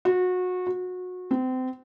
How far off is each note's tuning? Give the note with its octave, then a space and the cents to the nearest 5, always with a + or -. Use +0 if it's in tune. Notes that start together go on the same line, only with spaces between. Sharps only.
F#4 -25
F#4 -25
C4 -30